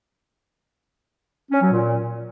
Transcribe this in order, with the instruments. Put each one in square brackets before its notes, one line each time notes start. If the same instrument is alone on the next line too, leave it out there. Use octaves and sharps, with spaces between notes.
[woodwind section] C#4
F#3
A#2